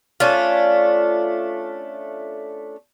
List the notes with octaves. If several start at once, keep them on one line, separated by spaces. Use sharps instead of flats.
A3 C#4 D4 F4